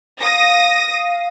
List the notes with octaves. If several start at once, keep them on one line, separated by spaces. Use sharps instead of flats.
F5 D#6 A#6